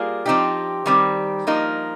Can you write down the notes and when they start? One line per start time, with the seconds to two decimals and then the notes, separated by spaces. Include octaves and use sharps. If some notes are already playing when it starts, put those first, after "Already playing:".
Already playing: G3 A#3 F4 G#4
0.26 F3 C4 D#4 G4
0.86 D#3 G3 C4
1.47 F3 A#3 D#4